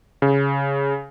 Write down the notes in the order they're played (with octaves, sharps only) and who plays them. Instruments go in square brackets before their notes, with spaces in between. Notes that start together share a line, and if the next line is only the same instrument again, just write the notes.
[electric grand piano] C#3